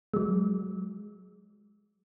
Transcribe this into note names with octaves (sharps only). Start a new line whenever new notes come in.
F#3 G#3